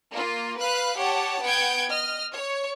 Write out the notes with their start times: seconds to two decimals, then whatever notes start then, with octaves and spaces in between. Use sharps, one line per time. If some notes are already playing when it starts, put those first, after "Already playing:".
0.13 A#3 F4
0.60 B4 F5 B5 F#6
0.99 G4 C#5 F#5 A5
1.44 B3 F#5 G5 G6 G#6 D7
1.89 D#5 F6
2.34 C#5